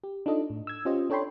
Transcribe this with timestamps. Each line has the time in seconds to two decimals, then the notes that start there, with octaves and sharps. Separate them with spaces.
0.04 G4
0.26 D4 D#4 F4 A4 D#5
0.50 A2
0.67 E6 G#6
0.85 C#4 F4 G4 C5 D#5
1.10 D4 A4 C#5 G5 B5 C6